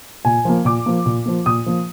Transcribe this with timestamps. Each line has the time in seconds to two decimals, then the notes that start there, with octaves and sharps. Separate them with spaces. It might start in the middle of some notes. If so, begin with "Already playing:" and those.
0.25 A#2 G#5
0.45 F3 A#3
0.65 A#2 D6
0.86 F3 A#3
1.06 A#2
1.26 F3 A#3
1.46 A#2 D#6
1.66 F3 A#3